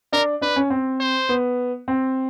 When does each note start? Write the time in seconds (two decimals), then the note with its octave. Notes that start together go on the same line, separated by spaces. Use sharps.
0.12 D4 A#4
0.41 D4 B4
0.56 C#4
0.70 C4
1.00 C5
1.29 B3
1.88 C4